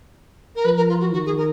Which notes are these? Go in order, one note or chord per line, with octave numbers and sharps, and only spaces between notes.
A#4
F3 B4
A#4
F4
F#4
D#3 F#4
G#4
A#4